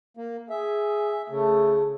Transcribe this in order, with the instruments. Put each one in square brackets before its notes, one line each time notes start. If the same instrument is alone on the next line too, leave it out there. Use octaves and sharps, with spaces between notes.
[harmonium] A#3
[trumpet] G#4 [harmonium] E5
[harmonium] C#3 [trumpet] A3